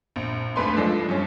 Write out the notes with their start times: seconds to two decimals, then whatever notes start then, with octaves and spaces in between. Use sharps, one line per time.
0.16 A#1
0.56 G#1 D2 B4 C6
0.77 F3 G#3 D4 A4
1.09 G2 C#4